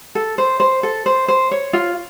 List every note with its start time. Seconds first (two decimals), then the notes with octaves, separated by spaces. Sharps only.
0.15 A4
0.38 C5
0.60 C5
0.83 A4
1.06 C5
1.28 C5
1.51 C#5
1.73 F4